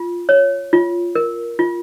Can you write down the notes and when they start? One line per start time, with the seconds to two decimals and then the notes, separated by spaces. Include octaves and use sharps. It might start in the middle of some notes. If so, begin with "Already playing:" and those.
Already playing: F4
0.29 C#5
0.73 F4
1.15 A#4
1.59 F4